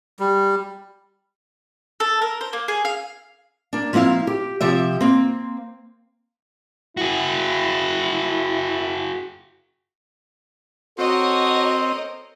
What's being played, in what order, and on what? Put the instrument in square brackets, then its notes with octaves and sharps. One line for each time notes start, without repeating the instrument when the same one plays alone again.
[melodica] G3
[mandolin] A4
A#4
C5
A#3
G#4
F5
[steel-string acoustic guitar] A#3 D4
F3 A#3 C4 E4 F5
G4
C3 F3 G4 E5
A#3 C4
[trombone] E4 [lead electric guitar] F#4 G#4
[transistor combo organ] C4 [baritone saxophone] F#4 [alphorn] A4 [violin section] A#4 C#5 D#5